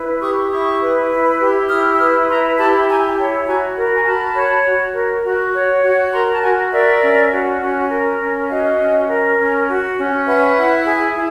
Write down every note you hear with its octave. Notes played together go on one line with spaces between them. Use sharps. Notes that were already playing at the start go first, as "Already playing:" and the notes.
Already playing: E4 B4
G4 C#6 D#6
E4 C#6 D#6
B4
E4
G4
E4 D#6 F6
E6
B4 D#6 F6
E4 A#5 C6
G4 A5 B5
E4 G#5 A#5
C#5 G5 A5
F#4 G#5 A#5
A#4 A#5
B5
G#5 A#5
F#4 A5 B5
C#5
F#4
A#4
F#4
C#5
F#4
A#4 A#5 C6
A5
F#4 F#5 G#5
A#4 D5 E5
C#4
F#4
C#4
A#4
C#4
F#4 D#5 F5
C#4
A#4
C#4
F#4
C#4
B4 E5 F#5
E4
G#4
E4